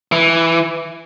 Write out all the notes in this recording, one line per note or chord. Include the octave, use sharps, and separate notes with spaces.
E3